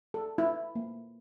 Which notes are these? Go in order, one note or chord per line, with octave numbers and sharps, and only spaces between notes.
A4
E4
A#3